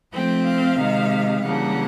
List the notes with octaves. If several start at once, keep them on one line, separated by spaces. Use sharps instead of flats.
F3 A3 C4 G5
F5
C3 D#3 G#3
C#3 E3 G3 A#3 D4 F#5